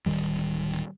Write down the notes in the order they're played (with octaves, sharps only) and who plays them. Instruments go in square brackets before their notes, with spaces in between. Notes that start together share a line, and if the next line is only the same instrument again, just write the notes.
[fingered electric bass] D1 C#2 D#3 G3